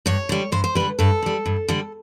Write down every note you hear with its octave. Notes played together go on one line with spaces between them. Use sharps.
G2 C#5
D3 G3
G2 C5
C5
D3 G3 B4
G2 A4
D3 G3
G2
D3 G3